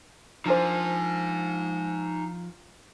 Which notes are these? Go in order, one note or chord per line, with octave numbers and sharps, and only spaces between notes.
F3 D4 D#4 A#4 C5 G#5